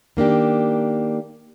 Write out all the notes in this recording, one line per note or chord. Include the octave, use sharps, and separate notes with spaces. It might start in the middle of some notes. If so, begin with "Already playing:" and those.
D#3 A#3 D4 G4